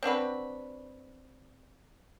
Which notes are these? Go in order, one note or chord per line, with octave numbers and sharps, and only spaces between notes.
C4 D4 F#4 B4